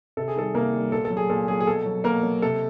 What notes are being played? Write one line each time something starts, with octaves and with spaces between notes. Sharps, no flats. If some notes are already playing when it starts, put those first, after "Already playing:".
C3 A4
G#4
D#3 G3 A4
C3 A#3 A#4
D#3 G3
A#2 A4
A4
F#3
G#4
A#2 A4
F#3 G#4
G#4
B2 A4
F#3
B2 A#3 A#4
F#3
C3 A4